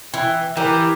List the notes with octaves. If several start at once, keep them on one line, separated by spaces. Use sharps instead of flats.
E3 G5
E3 G4 A#4